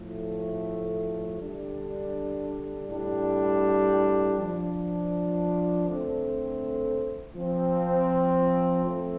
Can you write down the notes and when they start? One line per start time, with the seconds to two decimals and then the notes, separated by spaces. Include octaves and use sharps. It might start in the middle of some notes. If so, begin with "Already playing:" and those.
Already playing: A2 F3 A3
1.40 D3 G3 D4
2.88 A2 G3 D4
4.38 F3 D4
5.87 D3 A3 C4
7.35 F3 C4
8.84 F3 A3 C4